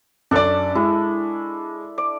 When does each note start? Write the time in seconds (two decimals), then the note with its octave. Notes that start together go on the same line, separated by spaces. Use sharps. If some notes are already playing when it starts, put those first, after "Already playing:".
0.31 F#2 D4 A4 D5 C#6
0.75 G#3 E4
1.98 D5